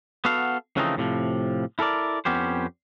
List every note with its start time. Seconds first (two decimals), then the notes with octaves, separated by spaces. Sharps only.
0.25 B3 F#4 A4 F5
0.77 C#3 E3 F3 A3 C4 D#4
0.97 A2 C3 F3
1.79 E4 A4 A#4 D5
2.25 F2 B3 C#4 G4 C5